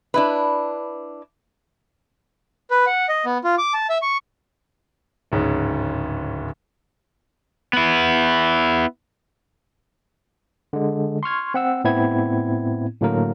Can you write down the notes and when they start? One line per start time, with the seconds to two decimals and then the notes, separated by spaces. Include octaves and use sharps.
0.14 D4 E4 B4
2.71 B4
2.87 F#5
3.09 D#5
3.25 B3
3.44 F4
3.58 D6
3.74 A5
3.90 E5
4.02 C#6
5.32 D1 G#2 C#3
7.73 B3 E4
10.73 D3 G#3
11.23 C6 C#6 F6 G#6
11.54 C4 F#5 E6
11.84 A2 B3 C4 E4 G#6
13.01 A2 D3 F#3 A#3 A#4